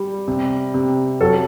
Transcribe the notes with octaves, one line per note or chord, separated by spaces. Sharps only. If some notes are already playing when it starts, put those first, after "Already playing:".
Already playing: G3
C3
C3
F#3 A4